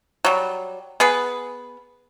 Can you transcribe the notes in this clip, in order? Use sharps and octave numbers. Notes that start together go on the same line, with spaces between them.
F#3 G3
B3 G#4 B4